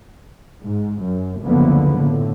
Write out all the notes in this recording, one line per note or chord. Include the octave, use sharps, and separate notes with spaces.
G#2
F#2
F#1 D2 D3 F3 A#3 B3
A2 D3